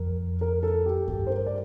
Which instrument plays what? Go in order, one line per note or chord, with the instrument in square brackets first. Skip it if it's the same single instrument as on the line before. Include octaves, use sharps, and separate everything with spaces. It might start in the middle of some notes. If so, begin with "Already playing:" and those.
Already playing: [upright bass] F2 [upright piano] A#4
[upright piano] A#4
A4
G4
[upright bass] G2 [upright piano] G4
[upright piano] C5
A#4
D5